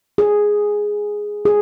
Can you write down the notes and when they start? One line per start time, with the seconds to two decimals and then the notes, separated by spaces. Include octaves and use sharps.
0.18 G#4
1.45 G#4